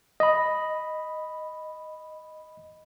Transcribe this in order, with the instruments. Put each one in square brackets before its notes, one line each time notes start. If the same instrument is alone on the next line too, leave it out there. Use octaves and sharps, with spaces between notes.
[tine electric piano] D#5 B5